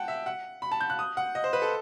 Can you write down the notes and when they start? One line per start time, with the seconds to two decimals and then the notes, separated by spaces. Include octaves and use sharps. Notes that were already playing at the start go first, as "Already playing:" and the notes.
Already playing: F#5 G5 A5
0.08 E5
0.26 F#5
0.62 B5
0.72 A5
0.81 G6
0.90 F#6
0.99 D#6
1.17 F#5
1.35 D#5
1.44 C5
1.53 B4
1.62 A4